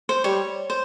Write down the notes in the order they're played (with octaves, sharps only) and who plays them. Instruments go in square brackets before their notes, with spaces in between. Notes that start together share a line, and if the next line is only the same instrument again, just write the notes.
[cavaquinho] C5
[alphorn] G3 [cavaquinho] C#5
[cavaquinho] C5